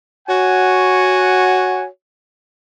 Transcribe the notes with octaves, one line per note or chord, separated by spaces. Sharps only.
F#4 C#5 F#5 G#5